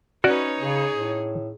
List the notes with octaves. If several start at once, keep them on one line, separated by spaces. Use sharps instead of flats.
C#4 D#4 F#4 B4 C#5 D5
C#3 G#4
A2